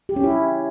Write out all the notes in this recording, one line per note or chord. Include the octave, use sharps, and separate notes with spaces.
G4
C#4
E4